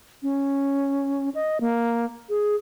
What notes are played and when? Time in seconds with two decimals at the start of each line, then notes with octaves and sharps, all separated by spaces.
0.23 C#4
1.35 D#5
1.61 A#3
2.29 G#4